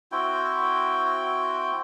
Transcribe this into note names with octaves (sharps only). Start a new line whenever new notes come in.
C4 E4 F#4 G5